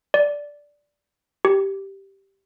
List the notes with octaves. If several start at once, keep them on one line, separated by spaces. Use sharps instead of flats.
D5
G4